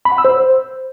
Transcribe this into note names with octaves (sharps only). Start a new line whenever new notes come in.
B5
F#5
E6
C5